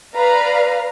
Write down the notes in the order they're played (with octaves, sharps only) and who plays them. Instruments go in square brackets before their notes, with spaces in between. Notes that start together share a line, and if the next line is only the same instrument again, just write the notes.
[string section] B4 D5 F5 A#5